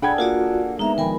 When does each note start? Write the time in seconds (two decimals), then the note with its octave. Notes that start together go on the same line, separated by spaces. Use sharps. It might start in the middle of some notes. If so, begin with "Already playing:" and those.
0.02 D4 G#4 A4 F#5 G5 B5 G#6
0.18 A#3 F4 F#4 D5 F#5
0.79 G#3 B3 D#4 E5 A#5
0.98 D#3 F3 A#4 G5 G#5 B5